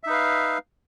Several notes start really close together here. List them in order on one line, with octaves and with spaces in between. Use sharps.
E5 D#4 B4 F5